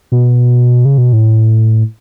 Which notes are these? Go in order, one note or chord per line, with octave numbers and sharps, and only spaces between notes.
B2
C#3
B2
A2